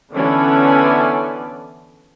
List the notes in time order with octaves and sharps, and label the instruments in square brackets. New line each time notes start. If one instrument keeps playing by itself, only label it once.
[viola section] D3 E3 B3 C#4 A4 D5